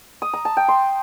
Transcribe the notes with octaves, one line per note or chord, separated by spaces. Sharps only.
D#6
A#5
A5
G5
C6